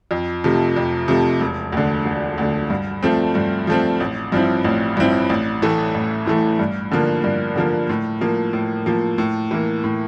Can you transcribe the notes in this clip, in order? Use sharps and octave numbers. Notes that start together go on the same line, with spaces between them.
F2
C3 F3 A3
F2
C3 F3 A3
E1
D2 D3
E1
D2 D3
G2
F3 A3 C4
G2
F3 A3 C4
A1
G2 F3 C4 E4
A1
G2 F3 C4 E4
A1
A2 E3 A3
A1
A2 E3 A3
G2
D3 F3 A#3
G2
D3 F3 A#3
A2
F3 A#3
A2
F3 A#3
A2
E3 A#3
A2